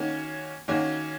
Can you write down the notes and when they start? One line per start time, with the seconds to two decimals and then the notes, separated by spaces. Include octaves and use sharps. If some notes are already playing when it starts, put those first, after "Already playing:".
Already playing: D#3 A#3 C#4 F#4
0.68 D#3 A#3 C#4 F#4